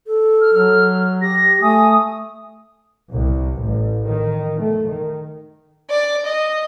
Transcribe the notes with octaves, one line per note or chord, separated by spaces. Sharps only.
A4
F6
F#3 F6
G4 A#6
A3 G#5 D#6
C2
A1
D#3
A3
D#3
D5
D#5